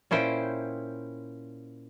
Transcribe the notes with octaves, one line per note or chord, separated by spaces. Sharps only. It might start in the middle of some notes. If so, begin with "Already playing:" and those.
A#2 C#4 E4 C5 G5